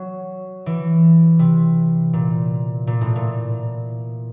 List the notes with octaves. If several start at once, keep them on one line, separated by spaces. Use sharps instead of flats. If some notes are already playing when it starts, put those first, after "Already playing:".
Already playing: F#3
E3
C3
A#2
A#2
A2
A#2